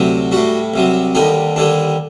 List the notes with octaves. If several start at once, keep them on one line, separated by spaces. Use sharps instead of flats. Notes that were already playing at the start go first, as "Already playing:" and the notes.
Already playing: D2 C3 F#3
A2 G3 F#4
C2 C3 F#3
D#2 D3 G3 D#4
D#2 D3 G3 D4